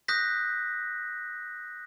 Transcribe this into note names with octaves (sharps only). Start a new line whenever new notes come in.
D#6 F#6 G6 A#6 B6